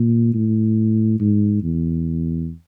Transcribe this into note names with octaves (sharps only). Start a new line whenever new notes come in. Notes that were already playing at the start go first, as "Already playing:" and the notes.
Already playing: A#2
A2
G#2
E2